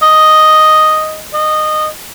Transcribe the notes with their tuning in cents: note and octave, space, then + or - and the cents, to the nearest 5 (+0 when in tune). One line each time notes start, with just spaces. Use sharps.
D#5 +0
D#5 -15